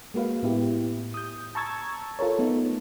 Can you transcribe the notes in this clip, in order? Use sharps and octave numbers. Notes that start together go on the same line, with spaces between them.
G#3 A#3 F#4 B4 F5
A2 B3 E4 G4
D#6 G6
A5 A#5 C#6 E6 G#6 A6
F4 A4 A#4 C#5
A3 B3 D#4